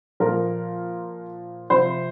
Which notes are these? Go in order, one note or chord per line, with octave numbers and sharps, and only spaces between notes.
A#2 F3 A#4
C3 F3 C5